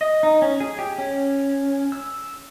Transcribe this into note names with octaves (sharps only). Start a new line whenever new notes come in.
D#5
D#4
C#4
G#4
G4
C#4
E6